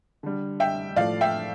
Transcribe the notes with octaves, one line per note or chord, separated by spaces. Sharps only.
D3 G3
E5 G5
A2 F3 A3 D5 F5
E5 G5